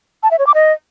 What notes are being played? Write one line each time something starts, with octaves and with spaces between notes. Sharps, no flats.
A5
E5
C#5
D6
D#5